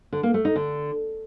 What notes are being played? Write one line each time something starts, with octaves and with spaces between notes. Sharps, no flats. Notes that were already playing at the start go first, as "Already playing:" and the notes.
D3
A#3
A3
D#4
D3